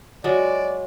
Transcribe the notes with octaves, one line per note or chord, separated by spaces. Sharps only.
F#3 G#3 D5